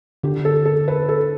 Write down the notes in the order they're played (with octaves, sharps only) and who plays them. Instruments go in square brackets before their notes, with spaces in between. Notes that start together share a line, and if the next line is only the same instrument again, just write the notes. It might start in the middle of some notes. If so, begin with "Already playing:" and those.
[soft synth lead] D3 [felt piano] G4
[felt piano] A4
A4
B4
A4